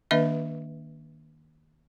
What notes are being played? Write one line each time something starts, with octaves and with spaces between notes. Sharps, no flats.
D#3 A#3 D4 B4 D#5 E5